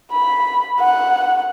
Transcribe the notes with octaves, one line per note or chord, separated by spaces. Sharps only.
B5
F#5